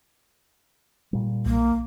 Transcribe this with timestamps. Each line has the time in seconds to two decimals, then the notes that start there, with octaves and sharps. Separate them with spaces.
1.13 A#2 G3
1.46 B1 A#3